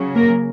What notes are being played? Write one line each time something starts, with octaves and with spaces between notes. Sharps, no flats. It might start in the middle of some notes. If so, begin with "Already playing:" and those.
Already playing: C#3 F#3 C#4
A#3 A#4